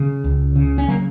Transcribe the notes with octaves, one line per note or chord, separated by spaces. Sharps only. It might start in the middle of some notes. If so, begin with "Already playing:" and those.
Already playing: C#3
C#2
C#3
C#4
F#3 A#3